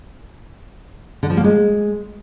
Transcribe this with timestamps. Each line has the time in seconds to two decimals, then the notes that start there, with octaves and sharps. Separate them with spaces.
1.23 D3
1.30 F3
1.37 A#3
1.44 G#3